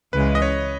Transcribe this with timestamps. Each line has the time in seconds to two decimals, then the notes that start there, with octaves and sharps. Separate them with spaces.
0.13 C#2 C#3 E3 G#3 B4
0.35 D#5
0.42 C#5